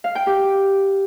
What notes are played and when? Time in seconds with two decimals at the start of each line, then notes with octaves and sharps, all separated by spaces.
0.04 F5
0.15 G5
0.27 G4